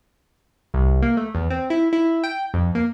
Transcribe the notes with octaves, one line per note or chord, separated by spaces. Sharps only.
C2
A#3
A3
E2
C4
E4
E4
G5
F2
A#3